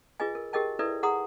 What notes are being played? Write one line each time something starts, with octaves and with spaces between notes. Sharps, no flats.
F4 G#4 B4 D#5 G#5
A#4
G4 G#4 A#4 D#5 G5 A5
E4 A4 B4 D5 E5
G#4 F#5 A#5 C6 D#6